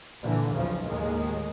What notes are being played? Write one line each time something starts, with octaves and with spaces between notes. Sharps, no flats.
A#2 D3 E3
B1 E2 C#3 F3
D#2 A2 D#3 G#3